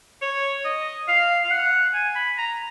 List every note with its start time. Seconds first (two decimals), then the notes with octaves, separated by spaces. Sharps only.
0.22 C#5
0.64 D#5
1.08 F5
1.44 F5
1.51 F#5
1.94 G#5
2.15 B5
2.38 A#5